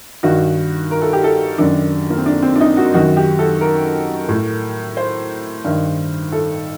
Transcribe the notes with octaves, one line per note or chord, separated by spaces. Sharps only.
G2 D#3 F#4
A#4
A4
G4
A4
F#2 D#3 D4
A#3
C4
D4
C4
D4
D#4
F#4
F#2 D#3 F#4
G4
A4
A#4
A2
C5
G2 D#3
A4